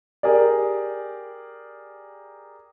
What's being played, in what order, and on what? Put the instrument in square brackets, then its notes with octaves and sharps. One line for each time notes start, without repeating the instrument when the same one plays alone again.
[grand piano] G4 G#4 A#4 D5